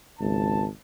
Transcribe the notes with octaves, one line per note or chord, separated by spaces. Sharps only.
G#1 C#2 A5